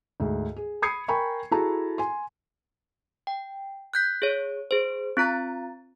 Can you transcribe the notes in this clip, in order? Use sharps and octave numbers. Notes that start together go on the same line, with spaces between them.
D2 G#2
G#4
B5 D#6 G#6 C7 C#7
A#4 G5 G#5 A#5 B5 C#6
E4 F#4 G#4 A4 A5 A#5
G#5 C6
G5
F#6 G6 B6
G#4 C#5
G#4 C5
C4 F4 A#5 A6